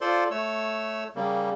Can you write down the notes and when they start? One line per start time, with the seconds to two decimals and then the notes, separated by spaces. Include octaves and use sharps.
0.01 F4 A4 C5 D5 C6
0.31 A3 C#5 E6
1.16 C#3 G3 A#3